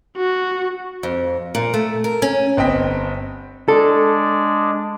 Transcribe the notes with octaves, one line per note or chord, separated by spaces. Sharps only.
F#4
F2
A#2
A3
A#4
C#4
G1 C4 D#5 G5 B6
G#3 D4 A4 D5